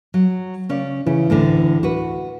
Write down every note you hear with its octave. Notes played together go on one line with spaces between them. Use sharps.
F#3
C#3 C#4 D5
C#3 E3
D2 A2 D3
F#4 B4